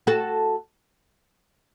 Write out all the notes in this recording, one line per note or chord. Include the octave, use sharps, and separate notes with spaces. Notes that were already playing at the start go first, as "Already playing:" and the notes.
F#4 A4